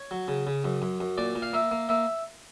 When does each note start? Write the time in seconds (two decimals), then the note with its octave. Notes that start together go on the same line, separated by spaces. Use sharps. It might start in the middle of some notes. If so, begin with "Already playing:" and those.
Already playing: C#5
0.11 F#3
0.28 C#3
0.47 C#3
0.64 F#2
0.82 F#2
1.00 F#2
1.18 A#2 D5
1.35 A#2
1.42 F5
1.53 A#3 E5
1.71 A#3
1.89 A#3 E5